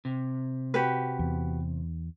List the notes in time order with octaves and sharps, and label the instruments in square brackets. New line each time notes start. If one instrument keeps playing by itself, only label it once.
[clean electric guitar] C3
[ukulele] F#4 G4 B4
[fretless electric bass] E2